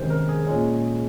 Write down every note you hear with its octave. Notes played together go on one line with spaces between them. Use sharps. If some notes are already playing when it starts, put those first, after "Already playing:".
Already playing: C3 D#3 G#3 C#4 C5
A#4
G#4
A#2 G#3 C#4